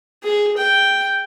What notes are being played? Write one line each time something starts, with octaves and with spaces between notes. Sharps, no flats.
G#4
G5